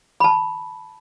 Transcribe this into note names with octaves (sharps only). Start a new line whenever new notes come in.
A5 B5